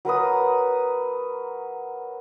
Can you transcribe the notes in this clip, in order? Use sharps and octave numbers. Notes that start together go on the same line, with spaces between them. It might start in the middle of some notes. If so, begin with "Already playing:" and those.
F#3 A#4 B4 D#6